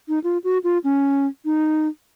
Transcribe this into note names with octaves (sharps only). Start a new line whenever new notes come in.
D#4
F4
F#4
F4
C#4
D#4